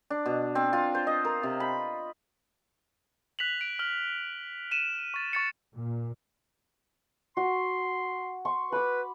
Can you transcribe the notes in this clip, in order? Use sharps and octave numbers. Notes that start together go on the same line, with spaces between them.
D4
B2
C4
F4
C5
D#5
A#4
C3
B5
F#6 B6 F7 F#7
D7
F6 F#7
D#7 E7
C#6 A6
C#6 A6 C#7
A#2
F#4 C6
C6 C#6
B4 B5 D6